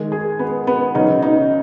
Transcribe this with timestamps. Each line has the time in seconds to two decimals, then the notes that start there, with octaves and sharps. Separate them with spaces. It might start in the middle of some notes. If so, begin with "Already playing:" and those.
Already playing: D#3 G#3
0.12 G#4
0.39 B3
0.67 B3
0.95 C#3 F#3 D#4
1.22 D#4